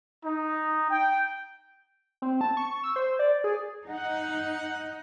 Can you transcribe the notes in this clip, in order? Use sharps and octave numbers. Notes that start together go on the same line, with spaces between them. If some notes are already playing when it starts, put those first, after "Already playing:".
D#4
G5
C4
A5
C#6
E6
C5
D5
G#4
D#4 F#5